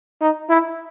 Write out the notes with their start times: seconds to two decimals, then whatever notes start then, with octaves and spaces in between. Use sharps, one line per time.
0.21 D#4
0.49 E4